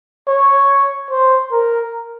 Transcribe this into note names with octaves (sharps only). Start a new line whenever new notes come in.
C#5
C5
A#4